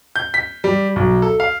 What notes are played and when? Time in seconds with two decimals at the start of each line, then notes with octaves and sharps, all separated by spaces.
0.16 G6
0.34 B6
0.64 G3
0.96 B1
1.22 A4
1.40 F5